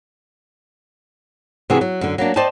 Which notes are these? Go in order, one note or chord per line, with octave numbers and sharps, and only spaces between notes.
C3 E3 B3 D4 F#4 G#4
F#3
F#2 D3
F#3 A#3 D4
C5 D5 D#5 G5 A5